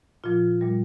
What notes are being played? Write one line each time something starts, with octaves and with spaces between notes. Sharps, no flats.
A#2 F3 F4
A#2 G3